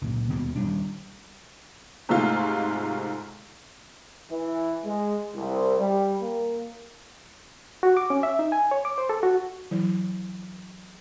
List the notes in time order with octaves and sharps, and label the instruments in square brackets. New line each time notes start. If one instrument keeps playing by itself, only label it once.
[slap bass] C#2 A#2
D#2 B2
D#1 G3 D4
[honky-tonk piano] G#2 C3 G#3 A3 D#4 F4
[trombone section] E3
G#3
C2
G3
A#3
[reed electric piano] F#4
D6
C#4
E5
D#4
G#5
C#5
D6
C5
A4
F#4
[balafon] E3 F#3 E4